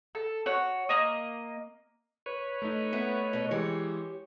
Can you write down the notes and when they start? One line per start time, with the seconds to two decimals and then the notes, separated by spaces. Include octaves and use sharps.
0.15 A4
0.46 F#4 C#5
0.89 A#3 D#5
2.26 B4 C#5
2.62 A3 D#4
2.93 B3 E5
3.33 B2 D#5
3.51 E3 G#3 G4 C#5